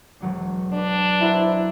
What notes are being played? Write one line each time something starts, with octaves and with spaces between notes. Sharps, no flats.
E1 F#3 D4
D4 B4 D6
E4 F#4 C5 A#5